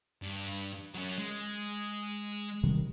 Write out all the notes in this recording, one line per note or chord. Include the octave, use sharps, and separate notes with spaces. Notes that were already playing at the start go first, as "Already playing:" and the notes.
G2
F#3 C#4
G#3
C3 D#3 G3